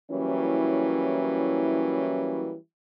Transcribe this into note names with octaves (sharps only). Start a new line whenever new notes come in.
E3 F#3 G3 A#3 C#4 E4